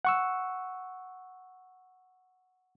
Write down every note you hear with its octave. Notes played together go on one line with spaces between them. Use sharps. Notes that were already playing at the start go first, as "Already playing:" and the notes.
F#5 C#6 E6